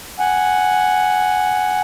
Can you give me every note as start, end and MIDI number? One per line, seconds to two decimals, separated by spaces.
0.19 1.81 78
0.19 1.81 80